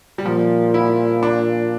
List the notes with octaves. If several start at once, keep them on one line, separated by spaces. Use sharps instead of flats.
G3
A#2 F3
E4
D4